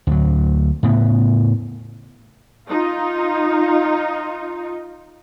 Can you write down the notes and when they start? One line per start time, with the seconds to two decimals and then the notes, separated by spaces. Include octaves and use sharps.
0.07 D2 F#3
0.83 A2 C#3 B3
2.69 D#4 F4